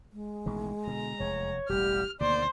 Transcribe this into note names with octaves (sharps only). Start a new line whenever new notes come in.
G#3
A1 B2 D#3
B2 D3 A#5
F1 E2 C#5
E1 A1 G3 G4 F6
D2 B2 D#3 A#3 C5 D5